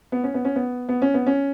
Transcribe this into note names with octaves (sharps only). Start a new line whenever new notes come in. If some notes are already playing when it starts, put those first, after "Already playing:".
B3
C#4
B3
C#4
B3
B3
C#4
B3
C#4